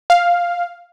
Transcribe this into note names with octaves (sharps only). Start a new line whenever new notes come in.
F5